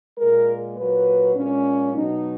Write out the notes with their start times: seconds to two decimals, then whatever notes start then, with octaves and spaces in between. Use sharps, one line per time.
0.18 A#2 G#3 A#4
0.77 A#2 F#3 B4
1.36 A#2 G#3 C#4
1.94 B2 F#3 D#4